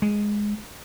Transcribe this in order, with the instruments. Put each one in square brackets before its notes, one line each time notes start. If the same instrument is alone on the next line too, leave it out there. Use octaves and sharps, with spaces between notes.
[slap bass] G#3